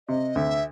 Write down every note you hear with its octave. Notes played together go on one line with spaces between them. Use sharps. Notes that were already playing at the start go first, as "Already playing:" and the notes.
C3 D#5
D2 E5